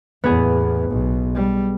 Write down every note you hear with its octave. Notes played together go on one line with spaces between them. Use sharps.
E2 A2 B3 G#4
B1
G3